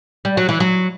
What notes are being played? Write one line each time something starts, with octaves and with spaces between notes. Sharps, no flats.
G3
F#3
E3
F#3